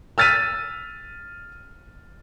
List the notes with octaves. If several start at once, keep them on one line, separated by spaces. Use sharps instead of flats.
E6 F6 A6 B6 D#7